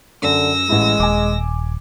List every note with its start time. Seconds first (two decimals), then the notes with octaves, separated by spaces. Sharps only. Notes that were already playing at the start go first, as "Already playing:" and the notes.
0.23 F#2 D3 E6 A#6
0.69 A1 G#3 E4
1.00 D#1 G#5 D6